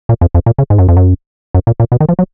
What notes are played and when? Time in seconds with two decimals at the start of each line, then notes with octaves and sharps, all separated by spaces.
0.09 A#2
0.21 F2
0.35 F2
0.46 A#2
0.58 C#3
0.70 G#2
0.78 F#2
0.88 F2
0.97 F#2
1.54 F#2
1.67 A#2
1.80 A#2
1.92 B2
2.00 D#3
2.09 F3
2.19 F#3